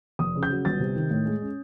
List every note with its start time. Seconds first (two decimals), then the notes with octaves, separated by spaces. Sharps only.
0.19 F1 D#6
0.36 C#3
0.43 G6
0.50 F#3
0.65 G1 A6
0.80 C3
0.95 D#3
1.11 A2
1.26 G#3
1.42 C#4